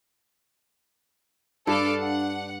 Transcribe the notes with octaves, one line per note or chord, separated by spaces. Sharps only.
G2 D4 A4 F5 D6
F#5